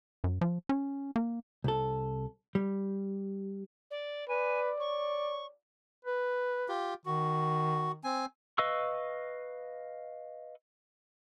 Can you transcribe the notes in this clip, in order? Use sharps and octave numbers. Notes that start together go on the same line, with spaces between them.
F#2
F3
C#4
A#3
C2 A4
G3
D5
B4 D5 G#5
C#5 C#6
B4
F4 G4
D#3 F#4
C4 G#5
B4 D#5 F5 C#6 E6